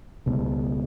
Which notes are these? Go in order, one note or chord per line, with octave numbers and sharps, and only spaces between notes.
C#2 B2